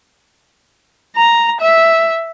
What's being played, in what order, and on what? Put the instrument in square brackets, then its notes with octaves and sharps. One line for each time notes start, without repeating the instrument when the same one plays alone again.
[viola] A#5
E5